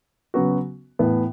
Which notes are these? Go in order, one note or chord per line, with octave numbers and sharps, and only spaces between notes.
C#3 F#3 B3 F#4
A2 E3 B3